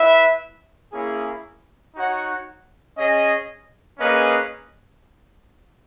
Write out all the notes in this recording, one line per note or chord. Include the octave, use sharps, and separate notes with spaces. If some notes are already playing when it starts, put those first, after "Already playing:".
Already playing: E4 B4 E5
A#3 C#4 E4 G#4
D#4 F#4 C#5 F#5
C#4 G#4 D#5
A#3 C#4 G#4 B4 D#5